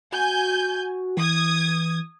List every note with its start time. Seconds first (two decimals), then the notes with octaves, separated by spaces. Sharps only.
0.12 F#4 G#5 G6
1.17 E3 D#6 G#6